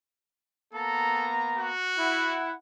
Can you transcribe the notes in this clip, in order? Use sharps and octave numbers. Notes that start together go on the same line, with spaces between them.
A#3 B3 A4 A#5
F#4
E4 F#5